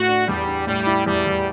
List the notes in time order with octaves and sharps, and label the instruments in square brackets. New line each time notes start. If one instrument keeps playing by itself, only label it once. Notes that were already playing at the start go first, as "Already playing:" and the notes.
Already playing: [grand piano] A2 [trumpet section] F#4
[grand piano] D4
[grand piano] E2 [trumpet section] G3
[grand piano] D4
[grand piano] A2 [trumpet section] G3
[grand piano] E4
[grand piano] E2 [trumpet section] G3
[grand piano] E2